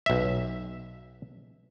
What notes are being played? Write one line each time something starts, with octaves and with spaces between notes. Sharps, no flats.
B1 E5